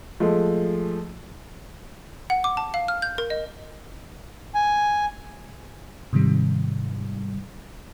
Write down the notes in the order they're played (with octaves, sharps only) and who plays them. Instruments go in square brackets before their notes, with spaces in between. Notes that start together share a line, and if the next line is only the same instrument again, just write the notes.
[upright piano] F3 G#3 A3
[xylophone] F#5
D6
A5
F5
F6
G6
A#4
D#5
[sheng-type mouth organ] G#5
[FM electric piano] G#2 C3 D#3 G3